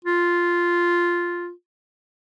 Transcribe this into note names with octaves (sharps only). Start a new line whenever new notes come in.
F4